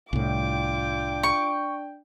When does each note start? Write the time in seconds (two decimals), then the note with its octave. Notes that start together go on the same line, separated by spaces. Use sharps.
0.13 C2 A2 D4 F4 G5 D6
1.23 C#6